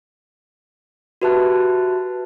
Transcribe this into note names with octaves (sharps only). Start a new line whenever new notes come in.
F#4 G4 B4 E5 A5 F#6